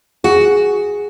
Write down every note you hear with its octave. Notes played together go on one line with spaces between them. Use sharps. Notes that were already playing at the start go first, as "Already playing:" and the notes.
F#4 G#4